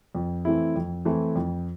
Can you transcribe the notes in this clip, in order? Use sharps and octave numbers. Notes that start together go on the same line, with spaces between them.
F2
E3 A3 C4 E4
F2
E3 A3 C4 E4
F2